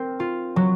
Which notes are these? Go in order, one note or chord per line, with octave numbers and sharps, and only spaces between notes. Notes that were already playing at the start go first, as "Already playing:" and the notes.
Already playing: C4 A#4
F4
F#3